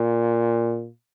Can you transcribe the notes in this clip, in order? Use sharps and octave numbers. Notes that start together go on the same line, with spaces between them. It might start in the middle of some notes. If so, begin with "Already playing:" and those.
Already playing: A#2